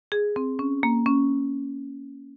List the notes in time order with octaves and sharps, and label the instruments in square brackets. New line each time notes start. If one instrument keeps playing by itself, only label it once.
[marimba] G#4
C4
C#4
A#3
C#4